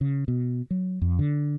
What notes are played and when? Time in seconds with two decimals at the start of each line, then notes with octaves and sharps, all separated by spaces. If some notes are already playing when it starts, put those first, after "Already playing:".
0.01 C#3
0.28 B2
0.71 F#3
1.02 F2
1.19 D3